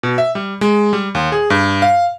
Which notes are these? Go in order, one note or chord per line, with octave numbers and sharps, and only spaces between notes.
B2
E5
G3
G#3
G3
D#2
G#4
G2
F5